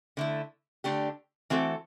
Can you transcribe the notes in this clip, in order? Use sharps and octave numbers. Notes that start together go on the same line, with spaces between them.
D3 A3 E4
D3 A3 D4 G4
E3 A3 C4 F#4 A4